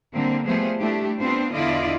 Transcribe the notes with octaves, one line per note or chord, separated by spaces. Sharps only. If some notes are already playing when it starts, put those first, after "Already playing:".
D3 G3 A#3 C4
F3 G3 A3 B3 G#4 C5
A3 D4 E4 G4
B3 C4 D4 F4 C5
E2 D3 E4 F4 D5 D#5